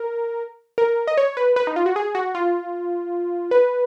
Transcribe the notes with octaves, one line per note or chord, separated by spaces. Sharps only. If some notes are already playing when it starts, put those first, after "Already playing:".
Already playing: A#4
A#4
D#5
C#5
B4
B4
D#4
F4
F#4
G#4
F#4
F4
B4